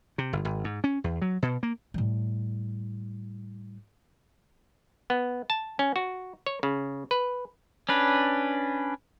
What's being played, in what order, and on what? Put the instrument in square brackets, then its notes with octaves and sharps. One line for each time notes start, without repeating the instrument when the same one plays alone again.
[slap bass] C3
G1
G#1
G#2
C#4
E2
F#3
B2
A#3
[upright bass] A2 G3
[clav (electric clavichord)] B3
A5
C#4
F#4
C#5
C#3
B4
[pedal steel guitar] C#4 D4 B4